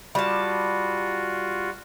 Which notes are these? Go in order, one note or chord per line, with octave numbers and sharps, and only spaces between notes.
G3 F4 F#4 A5